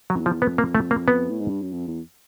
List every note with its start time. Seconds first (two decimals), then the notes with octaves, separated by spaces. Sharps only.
0.10 F#3
0.15 F2
0.20 E2
0.26 F3
0.42 F2 B3
0.58 A#3
0.75 A3
0.91 A#3
1.08 B3
1.29 A2
1.40 G#2
1.50 G2
1.62 F#2
1.72 F2
1.88 E2